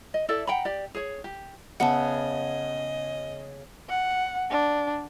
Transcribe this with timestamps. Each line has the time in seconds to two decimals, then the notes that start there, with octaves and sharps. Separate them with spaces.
0.14 D#5
0.28 E4 A4 D5 E5
0.47 F#5 G5 A#5 B5
0.65 G4 D5
0.95 G#4 C#5
1.24 G4
1.80 C#3 B3 D#5 E5 F#5 A5
3.89 F#5
4.50 D4